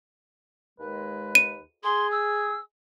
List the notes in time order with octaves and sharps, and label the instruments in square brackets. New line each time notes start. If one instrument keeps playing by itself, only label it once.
[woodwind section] D#2 G#3 B4
[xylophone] D#7
[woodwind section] G#4 [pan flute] C6
[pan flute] E6